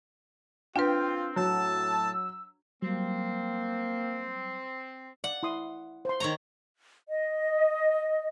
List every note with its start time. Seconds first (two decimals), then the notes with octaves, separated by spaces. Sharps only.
0.76 C4 D4 F4 B4 G5
1.36 A2 F#3 A5 E6
2.82 F#3 G3 A#3 C4
5.24 D5 F#5
5.43 E4 C6 D#6
6.05 C5 C6
6.20 D#3 C#5 A#5
7.09 D#5